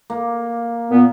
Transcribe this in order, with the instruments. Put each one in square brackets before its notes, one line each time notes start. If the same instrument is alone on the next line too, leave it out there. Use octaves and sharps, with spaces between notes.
[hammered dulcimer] A#3
[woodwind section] A#2 B3